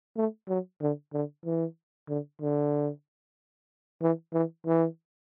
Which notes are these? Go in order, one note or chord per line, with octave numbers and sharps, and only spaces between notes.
A3
F#3
D3
D3
E3
D3
D3
E3
E3
E3